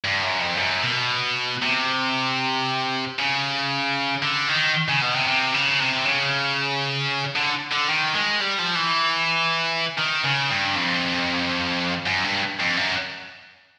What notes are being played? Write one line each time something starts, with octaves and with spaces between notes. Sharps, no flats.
G2
F#2
F2
F#2
B2
C3
C#3
D3
D#3
C#3
B2
C3
C3
C#3
C3
C#3
D3
D3
D#3
G#3
G3
F3
E3
D#3
C#3
G2
F2
F#2
G2
F2
F#2